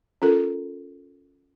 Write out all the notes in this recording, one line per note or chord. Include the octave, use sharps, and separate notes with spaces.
C#4 F4 A4 A#4